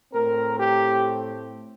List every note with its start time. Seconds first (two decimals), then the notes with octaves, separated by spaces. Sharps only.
0.13 A2 A3 C4 A#4
0.59 G4